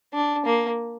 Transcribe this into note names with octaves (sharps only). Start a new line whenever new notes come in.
D4
A#3